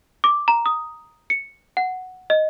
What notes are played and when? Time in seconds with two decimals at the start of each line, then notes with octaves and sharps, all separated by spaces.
0.24 D6
0.48 A#5
0.66 D#6
1.30 C#7
1.77 F#5
2.30 D#5